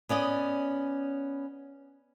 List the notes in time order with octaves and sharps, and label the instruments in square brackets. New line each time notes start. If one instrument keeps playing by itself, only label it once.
[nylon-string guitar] B3 C#4 D5 D#5